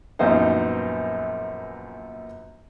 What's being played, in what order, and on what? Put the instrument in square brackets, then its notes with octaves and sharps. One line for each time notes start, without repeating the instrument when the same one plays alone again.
[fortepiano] A#1 F#2 E3 B3 D#4 C5